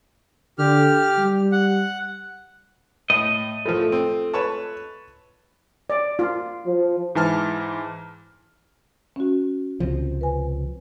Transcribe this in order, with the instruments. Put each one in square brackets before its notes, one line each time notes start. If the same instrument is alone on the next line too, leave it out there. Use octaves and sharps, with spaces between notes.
[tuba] D3 [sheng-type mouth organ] G4 F6
[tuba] G3
[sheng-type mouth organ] F#5
[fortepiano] A2 [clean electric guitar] D#5
[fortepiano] A2 F3 [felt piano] A3 F4
[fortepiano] C4
B4 C#5 A5
[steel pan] D5
F4
[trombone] F3
[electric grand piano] G#2 E3 A5 F6
[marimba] C#4 F#4
[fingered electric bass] C#2 C3 F3
[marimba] B4 G#5